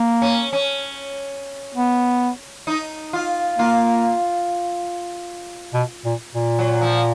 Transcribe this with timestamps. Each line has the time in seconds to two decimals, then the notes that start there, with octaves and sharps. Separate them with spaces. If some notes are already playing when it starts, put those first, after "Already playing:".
Already playing: A#3
0.22 C#4
0.53 C#4
1.74 B3
2.67 D#4
3.13 F4
3.59 A#3 F4
5.74 B2
6.05 A#2
6.35 A#2
6.59 F#3
6.81 F3